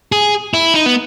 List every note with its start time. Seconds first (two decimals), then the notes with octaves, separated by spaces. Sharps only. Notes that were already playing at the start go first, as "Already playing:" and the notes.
0.12 G#4
0.54 E4
0.74 D#4
0.86 B3